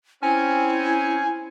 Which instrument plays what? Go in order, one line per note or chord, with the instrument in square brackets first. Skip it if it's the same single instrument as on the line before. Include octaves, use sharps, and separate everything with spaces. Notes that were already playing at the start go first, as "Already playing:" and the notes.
[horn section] C4 C#4 [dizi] E4 [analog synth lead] G#5